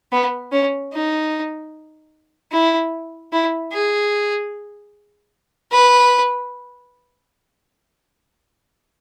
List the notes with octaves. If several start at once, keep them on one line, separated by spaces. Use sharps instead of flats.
B3
C#4
D#4
E4
E4
G#4
B4